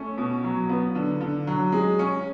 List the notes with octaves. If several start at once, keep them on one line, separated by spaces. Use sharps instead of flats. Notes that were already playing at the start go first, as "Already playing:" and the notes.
Already playing: A3 C#4
B2
F#3
B3
D3
D3
F#3
G#3
C#4